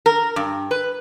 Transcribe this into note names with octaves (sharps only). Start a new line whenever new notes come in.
A#4
G2
B4